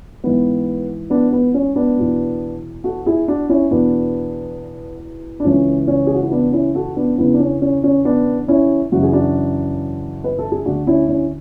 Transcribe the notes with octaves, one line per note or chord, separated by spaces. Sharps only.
G#2 E3 B3
B3 D4
B3
C#4
B3 D4
E2 B2
F#4 A4
E4 G#4
D4 F#4
C#4 E4
E2 B2 B3 D4
D4
C#2 C#3 E3 C#4
C#4
G#4
F#4
E4
B3 D4
C#4 E4
F#4 A4
B3 D4
E2 C#3 E3 B3
D4
C#4
C#4
C#4
B3 D4
C#4 E4
F#2 C#3 E3 F#4
G#4
D4 F#4
B4
A4
G#4
D2 D3 D4 F#4
C#4 E4
C#4 E4